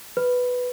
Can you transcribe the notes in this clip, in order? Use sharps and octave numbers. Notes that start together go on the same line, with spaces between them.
B4